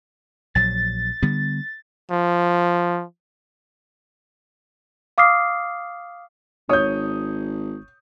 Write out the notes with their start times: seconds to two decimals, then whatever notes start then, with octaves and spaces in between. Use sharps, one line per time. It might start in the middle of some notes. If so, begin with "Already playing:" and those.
0.55 A#1 F#3 A6
1.22 D3 G3 B3
2.11 F3
5.18 F5 D6 D#6 F6 C7
6.69 G#1 C#5 D#6 G6